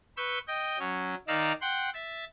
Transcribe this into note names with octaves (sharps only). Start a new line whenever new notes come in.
B4 C#6 E6 G6
D#5 G5
F#3 C#4
D#3 D#4 D5 F5 A#5 E6
F#5 G5 C6
E5 A6